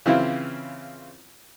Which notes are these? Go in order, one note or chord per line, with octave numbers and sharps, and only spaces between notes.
C#3 E3 C4 E4 F4